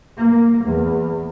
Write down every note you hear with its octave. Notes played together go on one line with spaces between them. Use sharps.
A#3
E2